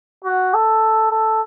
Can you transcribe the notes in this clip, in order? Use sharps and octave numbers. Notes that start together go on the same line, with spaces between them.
F#4
A4
A4